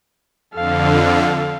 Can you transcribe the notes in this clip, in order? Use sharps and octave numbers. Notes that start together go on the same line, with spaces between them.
F2 D3 A4 F5